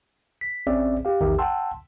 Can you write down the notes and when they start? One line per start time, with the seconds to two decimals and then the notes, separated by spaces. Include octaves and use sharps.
0.41 B6
0.67 A1 C4 C#4 G#4 D5 E5
1.05 G4 F5
1.21 A#1 E2 D#3 G4 A#4 E5
1.39 F#5 G5 A5 C6 E6